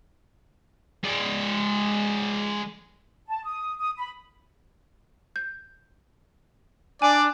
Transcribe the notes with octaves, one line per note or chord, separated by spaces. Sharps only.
G#3 D5
A5
D#6
D#6
B5
G6
D4 D5 G#5